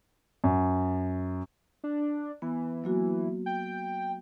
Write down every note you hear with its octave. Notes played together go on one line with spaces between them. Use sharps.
F#2
D4
E3 B3
F#3 A#3 F#4
G5